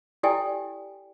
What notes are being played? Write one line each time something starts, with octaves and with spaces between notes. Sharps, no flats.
E4 G4 A4 D5 G5 G#5